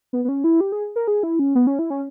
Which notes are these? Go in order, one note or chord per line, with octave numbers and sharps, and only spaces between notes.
B3
B3
C#4
E4
G4
G#4
A#4
G#4
E4
C#4
B3
C#4
E4
C#4